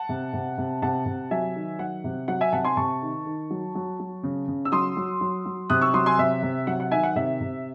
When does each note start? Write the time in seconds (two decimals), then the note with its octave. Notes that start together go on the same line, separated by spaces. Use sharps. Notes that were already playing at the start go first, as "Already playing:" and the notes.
Already playing: F#5 A5
0.09 C3
0.33 C3
0.58 C3
0.82 C3 F#5 A5
1.06 C3
1.31 F#3 E5 G#5
1.55 D#3
1.79 F#3 F#5
2.04 C3
2.28 F#3 F#5
2.41 E5 G#5
2.52 C3 F#5 A5
2.65 G#5 C6
2.77 C3 A5 C#6
3.02 D#3
3.26 D#3
3.50 F#3
3.75 F#3
4.00 F#3
4.23 C#3
4.48 C#3
4.65 E6
4.72 F#3 C6 D#6
4.97 F#3
5.21 F#3
5.45 F#3
5.70 C3 D#6 F#6
5.81 C#6 E6
5.94 F#3 C6 D#6
6.06 G#5 C6
6.18 C3 E5
6.43 C3
6.67 F#3 F#5
6.80 F#5
6.91 D#3 E5 G#5
7.03 F#5
7.16 C3 E5
7.41 C3